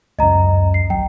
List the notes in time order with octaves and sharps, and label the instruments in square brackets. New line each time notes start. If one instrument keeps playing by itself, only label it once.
[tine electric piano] C#2 F#2 [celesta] D#5 A#5
[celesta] C7
[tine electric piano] G#1 F#3 [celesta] G5